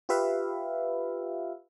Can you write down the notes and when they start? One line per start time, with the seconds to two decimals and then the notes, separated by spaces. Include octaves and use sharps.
0.09 F4 G4 B4 E5 F5